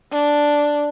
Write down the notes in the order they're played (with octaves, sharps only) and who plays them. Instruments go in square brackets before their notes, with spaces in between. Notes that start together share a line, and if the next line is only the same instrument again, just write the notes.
[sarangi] D4